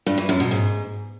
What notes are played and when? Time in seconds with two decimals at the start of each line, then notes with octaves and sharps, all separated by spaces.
0.07 G2
0.18 E3
0.29 F#2
0.40 B2
0.51 G#2